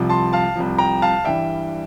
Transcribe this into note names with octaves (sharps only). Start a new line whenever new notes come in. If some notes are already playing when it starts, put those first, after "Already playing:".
Already playing: C2 C3 F3
A5 C6
F5 A5
C2 C3 F3
G5 A#5
F5 A5
G2 E3 G3 E5 G5